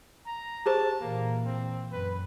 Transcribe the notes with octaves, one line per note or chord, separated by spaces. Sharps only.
A#5
G4 G#4 C5 A5
A#2 E3 A#3
C4
F#2 B4